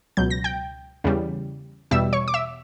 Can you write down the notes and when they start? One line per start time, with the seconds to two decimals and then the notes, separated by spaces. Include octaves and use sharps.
0.17 C#2 B2 F#3 G6
0.30 A#6
0.44 G5 G6
1.04 E2 C#3 G3
1.91 E2 B2 G3 E5 E6
2.13 C#5 C#6
2.28 D6
2.34 E5 E6